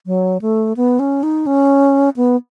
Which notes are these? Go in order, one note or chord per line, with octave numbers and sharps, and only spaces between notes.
F#3
A3
B3
C#4
D#4
C#4
B3